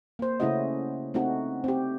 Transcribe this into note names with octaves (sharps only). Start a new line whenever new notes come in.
A#3 C5
C#3 A3 C#4 E4 F#4 D#5
A3 C4 D#4 F#4
C4 G4